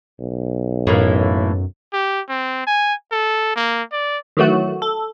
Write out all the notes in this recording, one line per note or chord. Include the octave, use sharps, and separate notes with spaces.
B1
F#2 A2 E3 A#3
G4
C4
G#5
A4
A#3
D5
D#3 E3 F#3 A3 F#4
A4